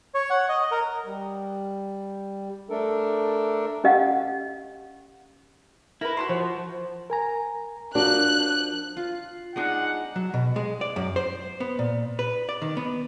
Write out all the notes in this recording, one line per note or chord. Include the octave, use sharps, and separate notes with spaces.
C#5
F#5
D#5
A#4
G3
A3 D4 A4 A#4
C#4 G4 D#5 F5 F#5
E4 A#4 B4
F#4 A5 C6
F3 C5
A#4 G#5 A#5
F3 D4 F#4 A#4 F#6
F4
G#3 D4 D#4 F#5
F#3
B2
G#3
D5
F#2
C5
B3
A#2
B4
D5
D#3
B3